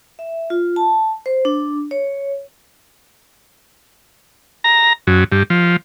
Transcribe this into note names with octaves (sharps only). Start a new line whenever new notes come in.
E5
F4
A5
C5
D4
C#5
A#5
F#2
G2
F3